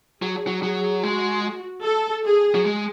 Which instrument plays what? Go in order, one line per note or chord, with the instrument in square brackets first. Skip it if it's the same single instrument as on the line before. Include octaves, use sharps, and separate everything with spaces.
[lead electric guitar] F#3 [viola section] G#4
[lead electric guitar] F#3
[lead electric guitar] F#3 [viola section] G#4
[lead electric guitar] G#3 [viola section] F#4
[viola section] A4
G#4
[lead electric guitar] F#3
G#3